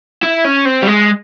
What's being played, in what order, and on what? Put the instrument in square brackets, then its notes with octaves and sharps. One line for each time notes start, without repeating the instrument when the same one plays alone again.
[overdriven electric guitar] E4
C#4
C4
G3
G#3